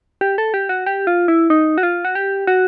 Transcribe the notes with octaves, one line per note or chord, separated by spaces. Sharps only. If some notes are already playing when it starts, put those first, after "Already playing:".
G4
A4
G4
F#4
G4
F4
E4
D#4
F#4
F4
F#4
G4
F#4